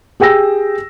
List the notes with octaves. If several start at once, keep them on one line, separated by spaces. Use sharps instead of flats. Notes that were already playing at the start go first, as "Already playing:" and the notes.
G4 G#4 G5 E6 A#6